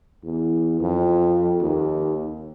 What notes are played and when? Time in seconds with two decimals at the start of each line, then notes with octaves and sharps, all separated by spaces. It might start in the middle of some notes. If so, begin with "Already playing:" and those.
0.24 E2
0.80 F2
1.62 D#2